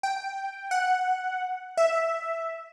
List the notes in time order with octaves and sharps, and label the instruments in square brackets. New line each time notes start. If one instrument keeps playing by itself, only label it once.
[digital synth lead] G5
F#5
E5